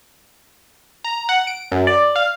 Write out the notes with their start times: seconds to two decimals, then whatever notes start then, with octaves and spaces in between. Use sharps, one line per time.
1.05 A#5
1.29 F#5
1.47 D7
1.72 F#2
1.87 D5
2.16 F5